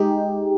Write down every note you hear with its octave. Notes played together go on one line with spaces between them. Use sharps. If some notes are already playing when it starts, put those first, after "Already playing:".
Already playing: G#3 D#4 G4